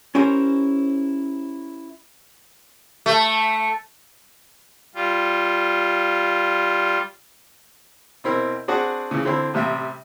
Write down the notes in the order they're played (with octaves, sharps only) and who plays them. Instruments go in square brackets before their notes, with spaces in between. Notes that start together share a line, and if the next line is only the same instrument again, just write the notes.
[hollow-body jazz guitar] C#4 E4 G4 A#4 C5 C#5
[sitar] A3
[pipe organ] G3 F4
[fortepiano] B2 C4 E4 A#4
C4 D4 F#4 G#4 F#5
C#3 E3
D3 C4 E4
A1 C3 G3 E5